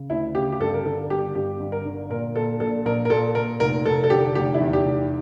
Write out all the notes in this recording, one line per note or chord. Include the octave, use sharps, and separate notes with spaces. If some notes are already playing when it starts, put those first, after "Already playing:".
Already playing: C#3
D2 E4
C#3 G4
G4
G1 A4
A#4
D3 A4
G1 G4
G1 G4
G1
A#4
D3
A#2 A#4
A#2 A4
A#1 A4
A#1 A#4
A#4
A#2 A4
A#2 A#4
F1 A#4
F1 A4
A4
D3 G4
F1 G4
E4
E2
G4
F1